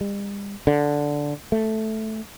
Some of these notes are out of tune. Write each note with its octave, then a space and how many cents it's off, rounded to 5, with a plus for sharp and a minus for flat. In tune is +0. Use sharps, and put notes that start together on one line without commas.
G3 +45
D3 -5
A3 -5